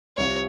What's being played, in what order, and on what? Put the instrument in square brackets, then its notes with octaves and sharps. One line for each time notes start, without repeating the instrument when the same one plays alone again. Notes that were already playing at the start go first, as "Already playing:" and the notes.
[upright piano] C2 C3 F3 C4 [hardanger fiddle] C#5